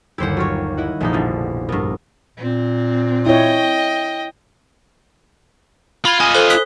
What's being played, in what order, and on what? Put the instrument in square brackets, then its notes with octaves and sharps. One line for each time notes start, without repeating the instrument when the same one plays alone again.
[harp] G1 D#2 G4 [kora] E4 C5 F#5
[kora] F#3 F4 C#5
[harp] E4 D#5 F#5
[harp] F1 A#1 [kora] E3 B3 D#4
[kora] B2 D3
[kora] G2 B3 [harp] A#4
[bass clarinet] A#2 [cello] C4
[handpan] E4 C#5 [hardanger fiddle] D#5 G5
[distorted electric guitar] F4 [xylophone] B5 G#6
[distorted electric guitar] F4 D#5 [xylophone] G#5
[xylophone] A4 C5 F#6
D#6 F#6 B6